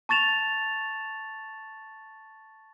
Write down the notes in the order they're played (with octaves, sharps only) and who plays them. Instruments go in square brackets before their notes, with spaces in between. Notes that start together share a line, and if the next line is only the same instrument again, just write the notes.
[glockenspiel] A5 C#6 A6 E7 F7